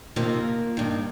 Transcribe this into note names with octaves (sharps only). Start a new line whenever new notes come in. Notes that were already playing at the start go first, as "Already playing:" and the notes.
F2 C3 D#3 A#3
G2 D#3